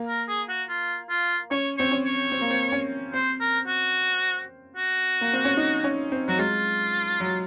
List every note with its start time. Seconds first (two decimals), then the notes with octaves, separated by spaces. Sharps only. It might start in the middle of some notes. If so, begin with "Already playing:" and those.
Already playing: A#3
0.08 A#4
0.28 G#4
0.49 F#4
0.69 F4
1.10 F4
1.51 C#4 C#5
1.78 C4 C#5
1.91 C#4
2.05 C#5
2.32 C4
2.41 A#3
2.50 C4
2.72 C#4
3.13 C4 C5
3.40 A#4
3.67 F#4
4.76 F#4
5.21 A#3
5.33 C4
5.45 C#4
5.57 D#4
5.84 C#4
6.12 C4
6.28 F#3 F#4
6.39 G#3 F4
7.20 F#3